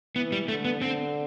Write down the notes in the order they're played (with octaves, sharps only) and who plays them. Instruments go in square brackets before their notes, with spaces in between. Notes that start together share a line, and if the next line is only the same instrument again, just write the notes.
[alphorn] E3 [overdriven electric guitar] B3
[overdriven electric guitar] G3
[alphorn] D3 [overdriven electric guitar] A3
[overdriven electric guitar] B3
[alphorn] D3 [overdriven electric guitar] C4